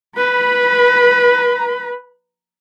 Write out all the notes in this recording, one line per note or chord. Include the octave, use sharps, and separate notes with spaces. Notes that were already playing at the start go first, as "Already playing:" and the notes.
B4 B5